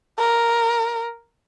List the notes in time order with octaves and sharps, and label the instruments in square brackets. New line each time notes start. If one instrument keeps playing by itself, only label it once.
[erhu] A#4